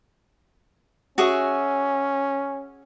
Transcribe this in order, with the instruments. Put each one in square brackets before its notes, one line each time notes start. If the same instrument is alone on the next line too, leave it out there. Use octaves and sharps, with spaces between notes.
[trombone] C#4 [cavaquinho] F#4 G#4 E5